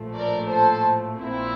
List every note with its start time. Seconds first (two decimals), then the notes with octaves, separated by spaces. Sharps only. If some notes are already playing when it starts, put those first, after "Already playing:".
Already playing: A#1 A2 F3 A3
0.15 A#4 D5
0.50 A4 C5
1.21 A#1 A#2 C4 E4